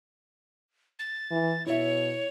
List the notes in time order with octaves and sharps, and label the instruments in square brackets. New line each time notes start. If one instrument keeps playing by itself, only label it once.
[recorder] A6
[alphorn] E3
[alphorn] B2 [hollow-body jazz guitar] E4 E5 [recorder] C#5